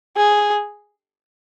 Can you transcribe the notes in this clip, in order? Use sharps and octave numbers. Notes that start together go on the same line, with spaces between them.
G#4